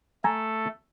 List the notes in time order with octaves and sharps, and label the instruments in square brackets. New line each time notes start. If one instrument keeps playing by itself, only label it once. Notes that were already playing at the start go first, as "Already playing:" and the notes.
[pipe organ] A3 A4 [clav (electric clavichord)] G#5 A#5